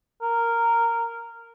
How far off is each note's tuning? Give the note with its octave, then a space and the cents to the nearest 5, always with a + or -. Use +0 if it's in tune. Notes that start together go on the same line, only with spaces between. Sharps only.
A#4 -10